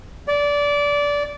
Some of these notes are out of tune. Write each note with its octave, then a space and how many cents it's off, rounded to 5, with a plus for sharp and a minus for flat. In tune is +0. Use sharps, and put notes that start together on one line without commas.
D5 -20